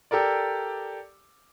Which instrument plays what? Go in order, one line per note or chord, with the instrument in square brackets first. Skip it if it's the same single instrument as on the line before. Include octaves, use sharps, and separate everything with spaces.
[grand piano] G4 A4 A#4 D5